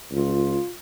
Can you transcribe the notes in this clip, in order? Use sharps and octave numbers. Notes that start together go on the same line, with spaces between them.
C#2 F4